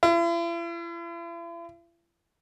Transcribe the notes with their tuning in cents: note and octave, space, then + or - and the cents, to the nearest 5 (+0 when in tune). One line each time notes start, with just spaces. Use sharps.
E4 +45